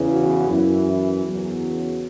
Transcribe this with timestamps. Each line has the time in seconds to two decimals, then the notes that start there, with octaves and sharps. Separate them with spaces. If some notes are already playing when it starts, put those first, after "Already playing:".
Already playing: E2 C#3 E3
0.09 F#4
0.48 F#2 E3 E4
1.25 E2 C#3 F#3